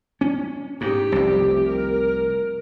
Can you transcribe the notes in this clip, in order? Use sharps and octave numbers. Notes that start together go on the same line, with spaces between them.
C#4
G#2 G4
F1 C2
A#4